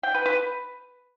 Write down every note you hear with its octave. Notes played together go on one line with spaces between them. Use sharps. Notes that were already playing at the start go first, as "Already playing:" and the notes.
G5
B4
B4